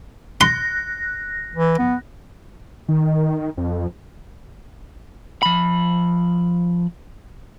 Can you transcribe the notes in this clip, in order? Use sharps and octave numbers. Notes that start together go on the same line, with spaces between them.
C6 F#6 A#6
E3
B3
D#3
F2
F3 B5